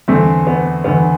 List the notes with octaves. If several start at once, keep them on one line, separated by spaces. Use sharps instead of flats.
E2 D3 A3 C4
B3
E2 D3 B3